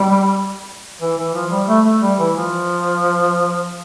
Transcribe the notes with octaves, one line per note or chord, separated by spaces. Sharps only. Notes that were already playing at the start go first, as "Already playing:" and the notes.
Already playing: G3
E3
E3
F3
G3
A3
A3
G3
E3
F3